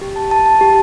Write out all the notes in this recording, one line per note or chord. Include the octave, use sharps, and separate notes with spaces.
G4
A5
A5
A5
G4